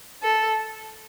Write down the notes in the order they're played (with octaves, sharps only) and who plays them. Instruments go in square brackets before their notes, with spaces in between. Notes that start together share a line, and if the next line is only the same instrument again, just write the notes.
[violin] A4